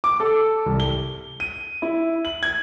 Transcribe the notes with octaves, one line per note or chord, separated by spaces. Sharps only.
D6
A4
C2
G7
D#7
E4
F#7
G#6